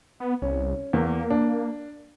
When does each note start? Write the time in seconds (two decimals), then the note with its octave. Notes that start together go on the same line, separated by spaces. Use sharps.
0.20 B3
0.42 C2 C#4
0.93 E2 A#3
1.30 D4